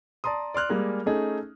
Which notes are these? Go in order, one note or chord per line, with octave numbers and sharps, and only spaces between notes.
D5 A5 A#5 C6 D#6
D5 C6 F6 F#6
G3 G#3 A#3 G#4 A#4
A3 C#4 D#4 G#4 A4